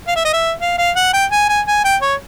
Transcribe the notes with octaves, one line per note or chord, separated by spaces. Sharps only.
F5
E5
D#5
E5
F5
F5
F#5
G5
G#5
G#5
G#5
G5
C#5